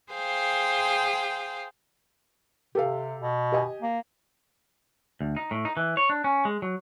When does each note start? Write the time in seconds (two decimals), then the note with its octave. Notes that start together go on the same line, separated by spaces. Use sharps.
0.12 G#4 C5 F5 G5
2.75 C3 G4 A4 F5
3.21 B2
3.52 G4 D#5 G#5
3.82 A#3
5.21 D2
5.37 D#4
5.51 A2
5.65 D#4
5.77 E3
5.97 C#5
6.09 D4
6.24 C#4
6.45 G#3
6.62 F#3